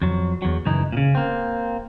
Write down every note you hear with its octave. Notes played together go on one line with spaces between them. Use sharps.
F2 F#3
E2 F#3
C#2 F#2 E3 D#4
A#2 C#3
A#3 C4